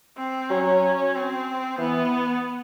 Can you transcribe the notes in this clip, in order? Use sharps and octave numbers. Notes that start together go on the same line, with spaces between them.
C4
F#3 C#4
C4
E3 B3